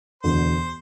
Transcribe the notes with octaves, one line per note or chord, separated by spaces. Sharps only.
E1 D2 D3 C5